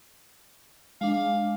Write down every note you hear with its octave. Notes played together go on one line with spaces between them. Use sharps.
G#3 D4 F5